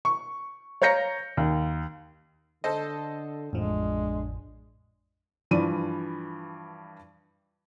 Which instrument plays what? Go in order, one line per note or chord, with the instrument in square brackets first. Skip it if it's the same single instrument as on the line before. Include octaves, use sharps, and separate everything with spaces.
[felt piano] C#6
C#5 F5 A#5 G6 A#6 C#7
D#2
[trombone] D3 [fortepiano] A4 C5 D#5
[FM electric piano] A1 F2 F3 [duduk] G#3 [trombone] D4
[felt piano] G2 E3 F3 D5 D#7